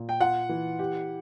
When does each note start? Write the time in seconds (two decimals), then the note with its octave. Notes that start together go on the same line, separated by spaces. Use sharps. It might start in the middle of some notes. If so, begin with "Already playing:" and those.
Already playing: A#2
0.09 G5
0.20 F4 F#5
0.49 E3
0.79 G4